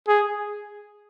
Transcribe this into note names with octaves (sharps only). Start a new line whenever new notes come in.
G#4